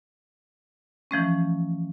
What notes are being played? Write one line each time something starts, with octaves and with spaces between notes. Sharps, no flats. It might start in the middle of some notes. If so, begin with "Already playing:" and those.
E3 F3 A3 C#4